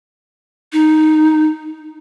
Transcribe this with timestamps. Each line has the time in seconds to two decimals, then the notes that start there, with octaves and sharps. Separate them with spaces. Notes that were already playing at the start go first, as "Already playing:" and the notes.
0.73 D#4